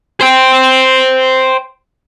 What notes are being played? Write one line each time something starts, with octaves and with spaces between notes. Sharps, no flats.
C5 G5